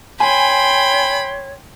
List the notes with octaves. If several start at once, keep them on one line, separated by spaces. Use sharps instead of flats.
C#5 G5 G#5 B5 C6